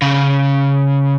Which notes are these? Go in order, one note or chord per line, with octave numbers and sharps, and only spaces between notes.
C#3